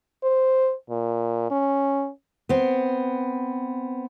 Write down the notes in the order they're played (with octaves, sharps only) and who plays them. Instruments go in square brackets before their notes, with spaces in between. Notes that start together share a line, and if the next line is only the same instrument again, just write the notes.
[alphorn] C5
A#2
C#4
[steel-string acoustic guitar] B3 C4